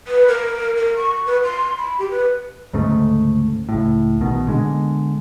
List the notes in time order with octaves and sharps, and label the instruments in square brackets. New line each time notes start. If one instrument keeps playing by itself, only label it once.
[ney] B4
A#4
A#4
C#6
B4
C6
B5
G4
B4
[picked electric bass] D2 G#2 C#3 A3
C#2 A2
A#1 B2 D#3
B2 D3 G#3